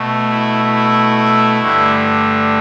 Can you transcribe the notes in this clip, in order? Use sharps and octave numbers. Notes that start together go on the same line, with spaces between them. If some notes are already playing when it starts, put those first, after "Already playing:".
Already playing: B2 A3
E4
E4
G2 D3 A3